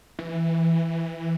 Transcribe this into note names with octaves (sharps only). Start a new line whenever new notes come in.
E3